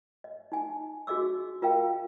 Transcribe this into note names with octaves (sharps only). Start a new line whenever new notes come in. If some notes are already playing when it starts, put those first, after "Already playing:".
D#5
D#4 G#5
D4 F#4 G#4 D#5 D6 E6
F4 A#4 D#5 F5 G5